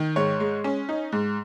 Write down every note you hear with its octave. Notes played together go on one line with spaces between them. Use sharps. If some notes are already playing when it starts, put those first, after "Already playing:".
Already playing: D#3
G#2 C#5
G#3
C#4
D#4
G#2